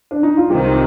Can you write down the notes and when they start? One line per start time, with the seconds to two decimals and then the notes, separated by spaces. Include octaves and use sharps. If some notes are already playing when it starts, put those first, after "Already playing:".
0.11 D4
0.23 D#4
0.37 F4
0.50 C2 C3 D#3 G4